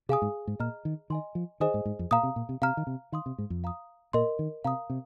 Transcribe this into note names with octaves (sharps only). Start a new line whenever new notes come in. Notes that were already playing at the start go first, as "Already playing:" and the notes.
C3 G#4 F5 G#5 D#6
G#2
G#2
A#2 D#5 A#5 F6
D#3
D#3 D#5 G#5 C6
F3
D#3 G#4 C5 D#5 G#5 D#6
G#2
G#2
F2
A#2 F5 A#5 D#6
C3
A#2
C3
C3 F5 A#5 F6
D#3
C3
D#3 F5 C6 D#6
C3
G#2
F2
F5 A#5 D#6
A#2 A#4 D#5 C6
D#3
C3 F5 A#5 D#6
C3